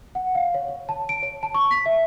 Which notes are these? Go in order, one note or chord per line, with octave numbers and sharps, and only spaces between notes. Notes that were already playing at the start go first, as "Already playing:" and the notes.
F#5
F5
C#5
C#5
A5
D7
C#5
A5
C#6
B6
E5